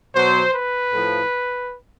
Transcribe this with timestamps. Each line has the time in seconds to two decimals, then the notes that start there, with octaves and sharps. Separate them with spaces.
0.16 B2 F#3 C5
0.54 B4
0.93 A2 F3